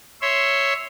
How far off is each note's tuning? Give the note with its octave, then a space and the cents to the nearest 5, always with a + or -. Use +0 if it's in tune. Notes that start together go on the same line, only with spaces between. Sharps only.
C#5 +0 E5 +0 C6 +0